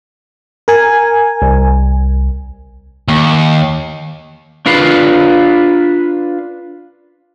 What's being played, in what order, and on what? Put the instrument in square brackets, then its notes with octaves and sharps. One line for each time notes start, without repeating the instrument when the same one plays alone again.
[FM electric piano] A#4 G#5
[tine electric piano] C2
[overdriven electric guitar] D#2
[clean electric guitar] D4 F4 B4 F5